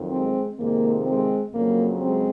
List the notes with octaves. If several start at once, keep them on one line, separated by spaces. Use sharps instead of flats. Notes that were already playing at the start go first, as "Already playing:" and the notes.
Already playing: F2 D#3 F#3
G#3 C4
F2 C3 D#3 G#3 A#3
G#3 C4
F2 C#3 F#3 A#3
G#3 C4